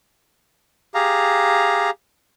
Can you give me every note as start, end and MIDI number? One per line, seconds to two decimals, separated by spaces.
0.94 1.90 67
0.94 1.90 68
0.94 1.90 77
0.94 1.90 82